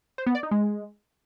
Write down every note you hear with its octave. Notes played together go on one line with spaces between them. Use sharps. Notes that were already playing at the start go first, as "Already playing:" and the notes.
C5
B3
D5
D#4
G#3